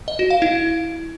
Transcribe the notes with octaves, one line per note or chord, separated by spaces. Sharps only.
D#5
F#4
F5
E4